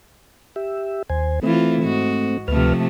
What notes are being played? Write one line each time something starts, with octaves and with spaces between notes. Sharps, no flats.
G4 E5
D#2 C5 G#5
E3 A3 C4 E4 F4
G#2 F#4
D2 C3 F3 A3 B4 F6